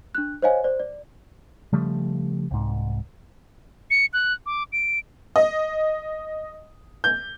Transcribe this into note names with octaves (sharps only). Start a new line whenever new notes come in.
D4 F#6
C5 C#5 D#5 F5 G#5
C5 D5
D5
C#3 F3 G3 A3
C2 G#2
C#7
F#6
D6
D7
D#5
G6